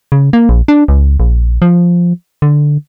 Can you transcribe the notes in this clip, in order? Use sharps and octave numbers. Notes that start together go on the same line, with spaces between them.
C#3
A#3
A#1
D4
C#2
A#1
F3
D3